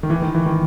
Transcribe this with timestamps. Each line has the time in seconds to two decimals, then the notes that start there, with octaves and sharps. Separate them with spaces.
0.03 D#3
0.10 E3
0.22 D#3
0.35 E3
0.46 D#3